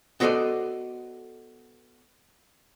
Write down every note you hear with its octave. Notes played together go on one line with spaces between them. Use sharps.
B3 F#4 A4 C5 D5 D#5